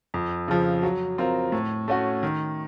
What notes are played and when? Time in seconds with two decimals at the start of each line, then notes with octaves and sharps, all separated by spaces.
0.14 F2
0.48 C#3 F3
0.83 F#3
1.18 C4 F4 A#4
1.52 A2
1.88 A3 C#4 F#4
2.23 D#3